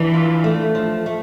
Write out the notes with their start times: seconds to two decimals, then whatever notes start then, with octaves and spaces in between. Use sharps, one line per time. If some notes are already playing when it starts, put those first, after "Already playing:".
Already playing: E3 D4
0.14 F4
0.44 A3
0.75 F3
1.06 A3